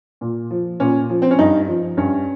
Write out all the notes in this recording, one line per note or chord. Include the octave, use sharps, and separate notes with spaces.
A#2
F3
A#2 C#4
F3
C4
C#4
G2 D#4
F3
G2 C#4